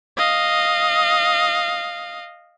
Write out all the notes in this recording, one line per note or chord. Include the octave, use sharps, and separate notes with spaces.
D#5 F5